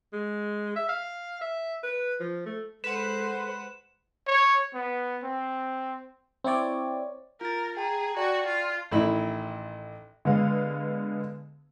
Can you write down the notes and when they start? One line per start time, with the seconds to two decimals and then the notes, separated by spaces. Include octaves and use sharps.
0.13 G#3
0.76 E5
0.89 F5
1.41 E5
1.83 B4
2.20 F3
2.46 A3
2.84 G#3 A4 B4 C5 F#5 E7
4.27 C#5
4.74 B3
5.23 C4
6.44 C4 E4 C#5 D5
7.41 F4 A#4 A6
7.77 G#4 G5 A5 A#5
8.17 F#4 D5 G5 A5
8.47 F4
8.91 A1 D#3 E4 B5
10.25 D3 G#3 B3 F5